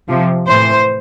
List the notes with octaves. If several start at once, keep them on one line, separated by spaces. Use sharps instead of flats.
C3 F3
A2 E3 C5